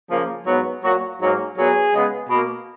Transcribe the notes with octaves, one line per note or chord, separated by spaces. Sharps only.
C#3 F3 A#3
G#2 F#3 B3
A#2 F#3 A#3 F#4
G#2 F#3 A#3
A#2 F#3 B3 G#4
C#3 G#3 B3
B2 A#3